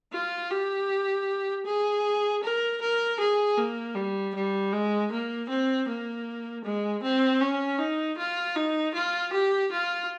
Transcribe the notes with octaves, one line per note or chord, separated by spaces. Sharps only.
F4
G4
G#4
A#4
A#4
G#4
A#3
G3
G3
G#3
A#3
C4
A#3
G#3
C4
C#4
D#4
F4
D#4
F4
G4
F4